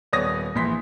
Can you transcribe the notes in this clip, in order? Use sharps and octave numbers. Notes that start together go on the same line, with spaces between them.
D#1 B3 C#5 D5 D#6 A#6
A#1 A#2 E3 C6 B6